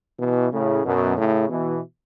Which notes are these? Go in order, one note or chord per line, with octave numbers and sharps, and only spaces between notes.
B2 E3
A2 C#3
F#2 B2
A2 C#3
B2 E3